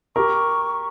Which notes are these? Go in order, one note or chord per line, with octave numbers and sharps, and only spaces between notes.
G4 A#4 C#6